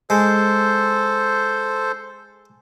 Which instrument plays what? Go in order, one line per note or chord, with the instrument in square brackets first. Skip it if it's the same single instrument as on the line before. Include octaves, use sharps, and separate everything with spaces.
[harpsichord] G#3 [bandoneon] A4 C5